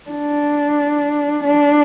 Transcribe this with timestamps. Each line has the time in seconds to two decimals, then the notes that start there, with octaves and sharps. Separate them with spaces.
0.11 D4
1.44 D4